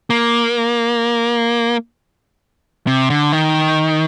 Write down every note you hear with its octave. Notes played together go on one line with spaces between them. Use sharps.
A#3
C3
D3
D#3